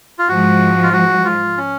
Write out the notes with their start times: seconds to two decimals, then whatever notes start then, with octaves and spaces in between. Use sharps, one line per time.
0.19 F4
0.29 G#2 F3 G#3 F#4
0.83 F4
0.93 F#4
1.25 F4
1.57 C#4